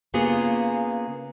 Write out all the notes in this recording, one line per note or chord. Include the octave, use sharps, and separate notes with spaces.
C#3 A#3 B3 F4 G#4